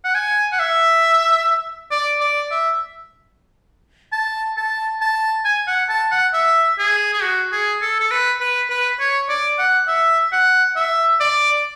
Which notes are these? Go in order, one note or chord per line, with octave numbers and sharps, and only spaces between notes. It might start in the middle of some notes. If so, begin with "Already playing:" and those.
F#5
G#5
F#5
E5
D5
D5
E5
A5
A5
A5
G#5
F#5
A5
F#5
E5
G#4
G#4
F#4
G#4
A4
A4
B4
B4
B4
C#5
D5
F#5
E5
F#5
E5
D5